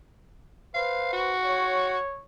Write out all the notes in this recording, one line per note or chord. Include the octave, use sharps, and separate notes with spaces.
B4 C5 F5
F#4
C#5